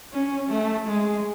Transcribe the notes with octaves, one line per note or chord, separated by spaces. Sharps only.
C#4
A3
G#3